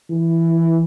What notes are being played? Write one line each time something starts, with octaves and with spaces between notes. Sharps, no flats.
E3